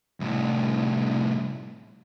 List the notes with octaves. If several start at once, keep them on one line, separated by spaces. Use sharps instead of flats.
C2 A2